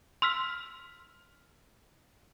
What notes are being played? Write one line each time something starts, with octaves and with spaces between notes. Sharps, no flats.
C6 E6 F6 B6